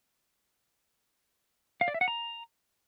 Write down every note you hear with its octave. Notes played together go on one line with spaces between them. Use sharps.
F5
D5
E5
F#5
A#5